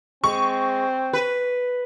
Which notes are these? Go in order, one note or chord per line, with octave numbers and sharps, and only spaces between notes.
G#3 C4 C#6
B4